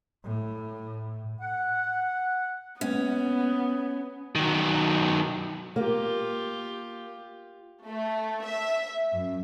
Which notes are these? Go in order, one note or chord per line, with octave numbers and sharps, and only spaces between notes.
A2
F#5
G#3 A#3 B3 C#4 B4
D#3 F#3
A#3 F4 G4
A3
E5
F#2